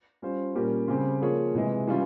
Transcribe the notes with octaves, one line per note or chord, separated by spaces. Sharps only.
G3 C#4 F4 C5
A#2 G3 C#4 G4 A#4
C#3 G3 C4 G4 C5
F3 A#3 F4 G#4 C#5
C3 E3 G#3
E3 G3 C#4 F4